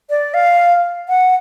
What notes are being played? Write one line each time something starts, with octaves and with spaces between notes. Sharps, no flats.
D5
F5
F#5